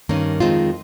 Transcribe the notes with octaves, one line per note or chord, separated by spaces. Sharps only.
G2 D#3 A#3 C#4
F2 D#3 G#3 C4 F4